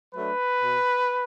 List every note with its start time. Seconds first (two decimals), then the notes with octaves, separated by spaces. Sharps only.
0.14 F#3 A3 D4 B4
0.61 B2